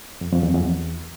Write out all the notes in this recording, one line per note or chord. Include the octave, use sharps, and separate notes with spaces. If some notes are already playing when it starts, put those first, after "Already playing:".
F2
F2
E2
F2
E2